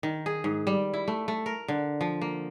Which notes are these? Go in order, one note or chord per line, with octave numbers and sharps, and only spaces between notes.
D#3
G#4
G#2
G3
E4
A3
A3
A#4
D3
F3
A#3